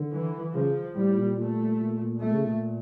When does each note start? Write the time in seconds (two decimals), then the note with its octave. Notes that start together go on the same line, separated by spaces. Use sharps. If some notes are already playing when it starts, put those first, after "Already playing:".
Already playing: D3
0.12 E3
0.54 C#3 F3
0.96 A2 G3
1.07 A2
1.17 A#2
1.37 A#2 A3
1.59 A#2
1.80 A#2
2.01 A#2
2.21 A#2 A3
2.33 C#3
2.45 A#2